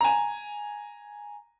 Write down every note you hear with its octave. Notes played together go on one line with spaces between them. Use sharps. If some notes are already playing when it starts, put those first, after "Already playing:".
G#5 A#5